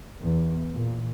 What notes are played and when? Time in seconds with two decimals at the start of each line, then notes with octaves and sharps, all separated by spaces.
0.22 E2
0.74 A#2